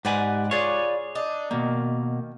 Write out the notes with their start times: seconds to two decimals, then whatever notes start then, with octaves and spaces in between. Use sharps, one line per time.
0.05 G#2 G4 B4 D5 F#5 G#5
0.51 F4 G#4 B4 C#5 D5
1.15 D4 D#4
1.51 B2 D#3 A#3